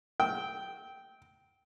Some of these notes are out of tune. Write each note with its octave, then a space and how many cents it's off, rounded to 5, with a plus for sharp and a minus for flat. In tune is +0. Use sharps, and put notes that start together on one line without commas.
G5 -10 E6 -35